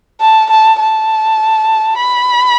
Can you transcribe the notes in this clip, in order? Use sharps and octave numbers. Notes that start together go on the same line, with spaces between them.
A5
A5
A5
B5